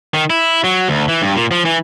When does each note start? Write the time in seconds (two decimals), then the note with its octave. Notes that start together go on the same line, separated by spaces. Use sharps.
0.14 D#3
0.30 E4
0.64 F#3
0.88 D2
1.08 E3
1.22 G2
1.36 A#2
1.51 F3
1.65 E3